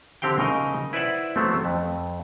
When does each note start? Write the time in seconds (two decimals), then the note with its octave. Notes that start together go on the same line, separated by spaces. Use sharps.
0.22 D3 C4 G4 F5 G5
0.39 C#3 D#4 A#4 D#5
0.93 E4 B4 C5 D5 E5 F#5
1.36 F3 F#3 A3 B3 C4
1.65 F2